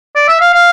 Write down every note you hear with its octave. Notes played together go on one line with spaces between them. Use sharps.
D5
E5
F5
F5